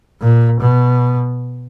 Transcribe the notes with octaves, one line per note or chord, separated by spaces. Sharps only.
A#2
B2